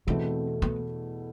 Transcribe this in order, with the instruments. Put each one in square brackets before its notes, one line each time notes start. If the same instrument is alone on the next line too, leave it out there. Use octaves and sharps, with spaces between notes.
[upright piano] E2 B2 A3 E4 [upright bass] C4
[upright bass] B3